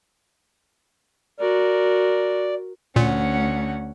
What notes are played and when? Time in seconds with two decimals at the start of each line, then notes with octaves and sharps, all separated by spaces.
1.40 F#4 A#4 D5
2.96 D2 A#2 C#4 F#5